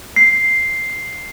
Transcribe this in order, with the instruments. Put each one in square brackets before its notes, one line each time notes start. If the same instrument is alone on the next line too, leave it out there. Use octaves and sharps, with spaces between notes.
[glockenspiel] C7